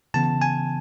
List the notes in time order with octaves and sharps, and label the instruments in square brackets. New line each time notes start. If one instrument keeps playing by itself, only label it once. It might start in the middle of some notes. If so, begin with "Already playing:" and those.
[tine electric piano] C#3 E3 B3 A5
G#5